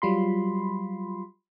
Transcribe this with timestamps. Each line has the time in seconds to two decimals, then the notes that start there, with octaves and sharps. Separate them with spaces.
0.02 F#3 G3 F4 B5 C6